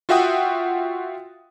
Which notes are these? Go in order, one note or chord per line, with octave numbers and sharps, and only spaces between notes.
F4 F#4 E5 F#5 G5 D#6